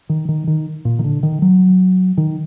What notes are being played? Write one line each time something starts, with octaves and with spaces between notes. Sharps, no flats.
D#3
D#3
D#3
A#2
D#3
D3
D#3
F#3
D#3